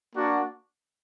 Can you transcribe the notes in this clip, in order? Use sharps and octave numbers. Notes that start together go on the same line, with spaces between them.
A#3 D4 F#4